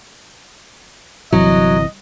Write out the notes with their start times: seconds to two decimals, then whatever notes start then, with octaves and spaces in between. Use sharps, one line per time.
1.33 G1 C3 E3 F#3 D#5